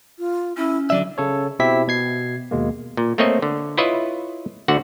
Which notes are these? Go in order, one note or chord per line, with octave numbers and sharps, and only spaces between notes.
F4
C#4 E4
D3 F#3 D5 E5
C#3 A4 C#5
B2 C4 E4 G4 E5 B6
B2 G#6 C7
D#2 B2 G#3 A#3
A#2
A3 A#3 C4 C#5 D#5
D3
E4 F4 B4 C#5 D#5 E5
D2 D3 F#4 F#5